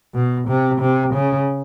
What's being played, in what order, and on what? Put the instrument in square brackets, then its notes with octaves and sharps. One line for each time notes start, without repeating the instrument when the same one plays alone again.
[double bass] B2
C3
C3
C#3